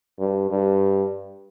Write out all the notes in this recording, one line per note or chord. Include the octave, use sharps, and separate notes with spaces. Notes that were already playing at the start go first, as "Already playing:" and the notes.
G2
G2